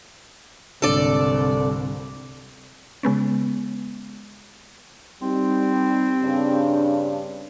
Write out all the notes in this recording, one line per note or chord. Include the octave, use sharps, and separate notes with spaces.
C2 G#2 D3 D4 A4 D5
C#3 G#3 B3 C#4
G3 C4 D#4
G2 C#3 D4